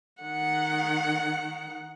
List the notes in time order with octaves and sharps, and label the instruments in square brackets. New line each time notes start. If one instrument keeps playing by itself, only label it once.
[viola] D#3 F#5